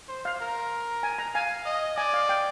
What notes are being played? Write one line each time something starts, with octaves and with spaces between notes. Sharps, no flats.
C5
F5
A#4
G#5
A#5
F5 G#5
D#5
D5 G#5
F5
G5